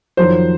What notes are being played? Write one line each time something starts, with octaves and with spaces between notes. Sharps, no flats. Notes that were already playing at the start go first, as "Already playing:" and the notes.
F2 D#3 F#3 C5